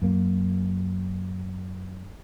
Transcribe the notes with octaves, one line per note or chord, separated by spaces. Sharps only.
F#2 A#3